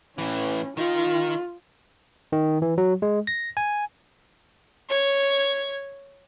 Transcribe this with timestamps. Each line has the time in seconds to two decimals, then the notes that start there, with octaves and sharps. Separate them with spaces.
0.18 A2 E3 C#4
0.77 D#3 D#4 F4
2.32 D#3
2.62 E3
2.78 F#3
3.02 G#3
3.27 A#6
3.57 G#5
4.89 C#5 G#6